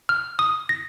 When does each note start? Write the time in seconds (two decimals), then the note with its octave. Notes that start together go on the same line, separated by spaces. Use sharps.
0.09 F6
0.39 D#6
0.69 A#6